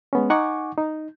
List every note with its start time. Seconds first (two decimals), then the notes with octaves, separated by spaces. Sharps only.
0.13 G#3 B3 C#4
0.30 D#4 F#5 G#5 C#6 D6
0.78 D#4